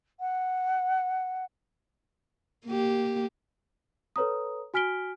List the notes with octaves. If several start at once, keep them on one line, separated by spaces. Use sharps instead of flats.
F#5
A#3 G4
A4 B4 C#5 A#5 D#6
F#4 G#5 F6 B6 D7 G7